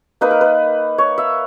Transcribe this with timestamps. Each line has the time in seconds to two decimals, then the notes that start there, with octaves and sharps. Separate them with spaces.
0.21 A#3 D#4 B4
0.31 A#4
0.41 B4
0.98 C#5
1.18 E5